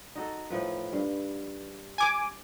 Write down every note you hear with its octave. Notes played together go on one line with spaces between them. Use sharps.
D#4 F#4 A4
A2 F3 B4
G2
G#5 D6